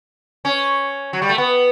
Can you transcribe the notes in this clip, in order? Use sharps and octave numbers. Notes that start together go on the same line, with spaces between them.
C#4
F#3
G3
A3
B3